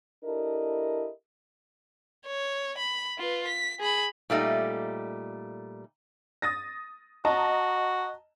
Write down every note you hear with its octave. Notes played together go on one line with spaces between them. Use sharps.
D4 E4 G4 A4 A#4 D#5
C#5
B5
F4 B4
B6
G#4 B5
A#2 G3 A3 D#4
D#6 A6 A#6
F#4 D#5 A5 A#5